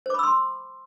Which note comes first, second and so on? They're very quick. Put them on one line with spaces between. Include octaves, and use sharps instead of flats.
C5 D6 B5 E6 C6